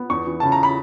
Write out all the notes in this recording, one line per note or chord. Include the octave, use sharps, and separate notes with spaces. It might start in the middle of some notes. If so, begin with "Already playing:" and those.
Already playing: B3
E2 C#6
E3
C#3 A5
A#5
B5